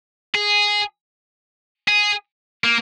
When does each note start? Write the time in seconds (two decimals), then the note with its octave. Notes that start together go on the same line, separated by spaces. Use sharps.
0.35 G#4
1.88 G#4
2.64 A#3